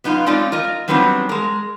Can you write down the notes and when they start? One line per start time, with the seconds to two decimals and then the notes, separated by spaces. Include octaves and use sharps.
0.04 F#2 B3 D#4 F4 F5
0.26 G#3 C4 C#4 D#4 F4 D5
0.52 F4 A#4 D#5
0.88 F#3 G3 B3 C4 D4 D#4
1.29 G#3 A#4